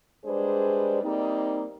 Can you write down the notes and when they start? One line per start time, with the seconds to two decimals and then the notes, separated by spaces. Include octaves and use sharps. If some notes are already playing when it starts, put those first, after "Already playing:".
0.24 G3 G#3 D4 G#4 B4 C5
1.02 G3 A#3 C4 D#4